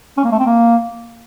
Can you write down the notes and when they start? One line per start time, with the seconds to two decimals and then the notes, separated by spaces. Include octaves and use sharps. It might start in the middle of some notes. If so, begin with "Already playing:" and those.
0.17 C#4
0.25 A#3
0.32 A3
0.39 C4
0.46 A#3